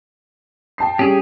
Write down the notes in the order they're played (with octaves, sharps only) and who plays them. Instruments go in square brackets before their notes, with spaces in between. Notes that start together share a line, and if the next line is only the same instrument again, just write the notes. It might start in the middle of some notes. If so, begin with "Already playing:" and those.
[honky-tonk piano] G5 A5 C7
[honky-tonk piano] G3 C#4 [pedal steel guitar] G4 G#4